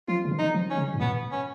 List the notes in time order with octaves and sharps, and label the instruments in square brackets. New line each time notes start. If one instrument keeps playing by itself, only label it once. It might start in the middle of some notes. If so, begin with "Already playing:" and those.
[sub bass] F3 [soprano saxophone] F4
[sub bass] C#3
D#3
[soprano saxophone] D#4
[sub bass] F3
[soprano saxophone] C#4
[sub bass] C#3
G#2
[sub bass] A#2 [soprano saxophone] B3
[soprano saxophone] C#4